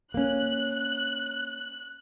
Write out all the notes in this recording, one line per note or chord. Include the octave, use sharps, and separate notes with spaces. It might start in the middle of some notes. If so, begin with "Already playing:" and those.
A#3 C#4 F#6